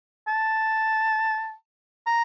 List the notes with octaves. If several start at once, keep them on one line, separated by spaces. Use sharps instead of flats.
A5
A#5